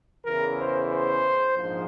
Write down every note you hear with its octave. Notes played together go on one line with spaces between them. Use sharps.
E2 C#3 E3 A#4
C5
C5
A#1 G#2 F3